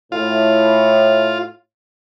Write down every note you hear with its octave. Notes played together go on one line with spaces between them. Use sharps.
A2 F4